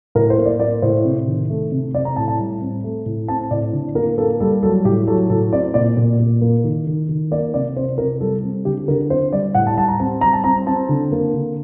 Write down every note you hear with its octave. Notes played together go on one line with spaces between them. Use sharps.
A2 A#4
C5
A#3
D5
A#3 D5
A2 C5
C3
D#3
A3
C3
C4 D5
A#5
A2 A5
A5
G3
C4
A3
A2
C4 A5
A2 D5
D3
A#3 A#4
A#3 A4
G3 A4
F#3 A4
A2 G4
F#3 A4
A2 A4
C4 D5
A#2 D5
A#2
A#2
A#3
D#3
D#3
D#3
A#3 D5
C3 D5
C3 C5
C3 A#4
G3 A4
C4
D3 G4
D3 A#4
C4 C5
G3 D5
A2 F#5
A5
G3 A5
A#5
C4 A5
G3 A#5
A5
C4 A#5
C4 A5
D3
A#3
D3